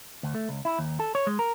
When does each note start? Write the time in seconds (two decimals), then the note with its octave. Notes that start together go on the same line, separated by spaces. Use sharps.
0.23 D2
0.35 A3
0.49 C#2
0.65 E4
0.79 D#2
1.00 A4
1.15 C#5
1.27 G#3
1.39 A#4